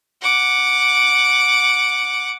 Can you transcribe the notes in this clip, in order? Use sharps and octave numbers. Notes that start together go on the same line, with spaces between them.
F#5 D6